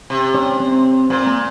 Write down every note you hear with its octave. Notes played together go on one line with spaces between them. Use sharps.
C3
C#4 C#5
C4 C5
A#2 C4 C5
A#3 A#4